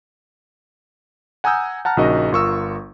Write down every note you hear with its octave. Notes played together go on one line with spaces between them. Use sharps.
F#5 G#5 A#5 D#6 E6 G6
F#5 A5 A#5 F6
A#1 C#3 D#4 F#4 A#4 D#5
G1 F4 A#4 C#6 D#6 E6